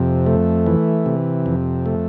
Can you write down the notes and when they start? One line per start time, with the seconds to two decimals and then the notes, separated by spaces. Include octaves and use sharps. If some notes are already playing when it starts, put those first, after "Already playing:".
Already playing: F2 C3
0.26 A3
0.66 E3
1.06 C3
1.46 F2
1.86 A3